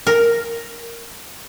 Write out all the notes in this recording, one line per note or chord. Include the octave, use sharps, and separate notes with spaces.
A#4